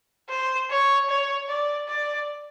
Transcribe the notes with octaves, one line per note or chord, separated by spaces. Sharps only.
C5
C#5
C#5
D5
D5